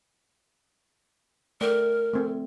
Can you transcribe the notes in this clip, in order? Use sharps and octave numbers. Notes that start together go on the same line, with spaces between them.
A3 A#4 D5 G5
A3 C4